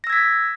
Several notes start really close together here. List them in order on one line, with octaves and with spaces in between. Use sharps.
A#6 E6 G#6 B6